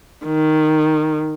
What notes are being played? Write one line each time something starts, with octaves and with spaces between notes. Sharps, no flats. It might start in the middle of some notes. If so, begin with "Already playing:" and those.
D#3